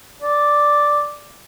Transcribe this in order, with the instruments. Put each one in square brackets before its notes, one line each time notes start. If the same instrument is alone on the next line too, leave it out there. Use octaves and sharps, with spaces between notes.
[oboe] D5